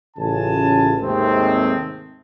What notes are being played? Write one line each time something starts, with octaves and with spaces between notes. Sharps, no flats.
A1 C#3 F4 G#5 A5
D#2 G#2 C3 G#3 A3 C4